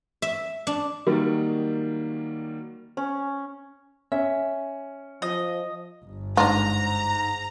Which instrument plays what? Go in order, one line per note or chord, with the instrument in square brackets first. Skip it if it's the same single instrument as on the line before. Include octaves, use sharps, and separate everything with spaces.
[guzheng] E5
D4
[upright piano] D#3 F#3 G3 A#3
[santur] C#4
[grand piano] C#4 [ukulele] E5
[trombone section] F3 [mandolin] D#5
[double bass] G1
[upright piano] G#2 [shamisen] D4 F4 [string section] A#5